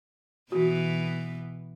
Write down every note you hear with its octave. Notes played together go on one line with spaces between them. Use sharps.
B2 E3 B3 F#4